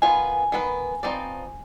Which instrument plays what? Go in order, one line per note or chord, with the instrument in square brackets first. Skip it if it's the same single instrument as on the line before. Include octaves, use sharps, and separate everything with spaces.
[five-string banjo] D#3 B3 F4 B4 [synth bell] G#5
[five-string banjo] D#3 B3 F4 B4
F3 C4 D#4 B4 D5